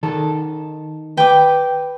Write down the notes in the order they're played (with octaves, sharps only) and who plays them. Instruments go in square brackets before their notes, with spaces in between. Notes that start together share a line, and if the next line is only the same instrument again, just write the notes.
[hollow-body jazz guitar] D#3 A4
[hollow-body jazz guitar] B4 [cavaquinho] G5 D6